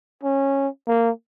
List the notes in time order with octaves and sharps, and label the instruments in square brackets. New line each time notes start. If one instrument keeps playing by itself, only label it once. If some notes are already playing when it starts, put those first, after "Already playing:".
[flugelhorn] C#4
A#3